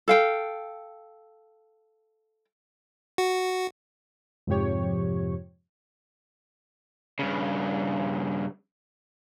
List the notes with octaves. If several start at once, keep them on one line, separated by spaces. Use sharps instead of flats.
A4 F5 G5
F#4
F2 G#2 C3 F3 G4 C#5
G2 C#3